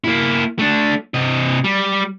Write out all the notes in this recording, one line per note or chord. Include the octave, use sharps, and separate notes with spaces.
A#3 E4
A3 D4
C3 D#5
G3